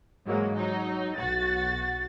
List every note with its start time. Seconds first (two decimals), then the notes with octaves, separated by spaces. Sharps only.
0.25 G#2 E3 F#3 G#3 A#3
0.56 F#3 D#4
1.18 B1 F#4 A6